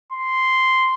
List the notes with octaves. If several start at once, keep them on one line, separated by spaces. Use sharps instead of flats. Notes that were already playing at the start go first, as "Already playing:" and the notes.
C6